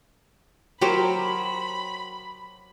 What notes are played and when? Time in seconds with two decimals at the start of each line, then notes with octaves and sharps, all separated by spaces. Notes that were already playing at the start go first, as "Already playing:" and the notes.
0.81 F#3 G4 A#4 C5 C#5 B5